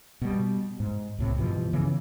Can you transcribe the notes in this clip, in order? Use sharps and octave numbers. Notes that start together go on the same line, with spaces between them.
B2 G3
G#2
C2 A2 C3
G2 B2 E3 F3
C#3 E3 B3